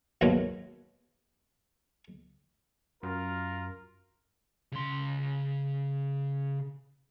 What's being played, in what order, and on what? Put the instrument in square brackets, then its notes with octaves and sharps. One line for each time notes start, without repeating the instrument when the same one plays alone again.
[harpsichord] D#2 G#2 B2 F#3 A#3
[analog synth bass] F#2 [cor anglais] F4 [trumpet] A#4
[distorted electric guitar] C#3 C6